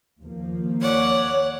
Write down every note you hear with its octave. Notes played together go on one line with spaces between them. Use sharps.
D#2 F3 A#3
C#5 D5 F#5